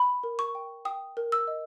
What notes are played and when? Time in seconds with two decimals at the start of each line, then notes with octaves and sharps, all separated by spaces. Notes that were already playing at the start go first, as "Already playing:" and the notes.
Already playing: B5
0.23 A#4
0.39 C#6
0.55 G5
0.85 G5 D#6
1.17 A#4
1.32 E6
1.47 D#5